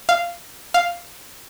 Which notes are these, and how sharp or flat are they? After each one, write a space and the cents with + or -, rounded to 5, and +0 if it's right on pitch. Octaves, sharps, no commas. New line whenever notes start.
F5 -10
F5 +0